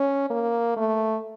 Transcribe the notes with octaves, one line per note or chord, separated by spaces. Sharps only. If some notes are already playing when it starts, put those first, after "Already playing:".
Already playing: C#4
A#3
A3